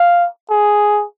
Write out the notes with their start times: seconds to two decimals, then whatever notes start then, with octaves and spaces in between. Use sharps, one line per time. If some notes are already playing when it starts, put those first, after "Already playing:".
Already playing: F5
0.51 G#4